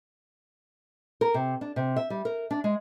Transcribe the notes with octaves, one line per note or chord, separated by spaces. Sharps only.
A#4
C3
D4
C3
E5
G3
A#4
D4
G#3